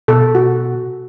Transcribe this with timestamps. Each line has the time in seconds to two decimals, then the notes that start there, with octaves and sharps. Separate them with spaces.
0.08 B2 A4
0.35 F#4